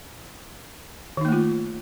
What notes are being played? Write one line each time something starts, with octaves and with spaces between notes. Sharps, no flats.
D#3 A3 A#3 D#4 F4